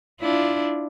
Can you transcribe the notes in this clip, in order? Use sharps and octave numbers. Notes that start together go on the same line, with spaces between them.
D4 E4 F4